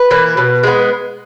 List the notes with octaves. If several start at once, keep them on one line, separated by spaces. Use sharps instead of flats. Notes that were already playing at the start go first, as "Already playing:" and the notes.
Already playing: B4
E3 A#3
B2
G#3 B3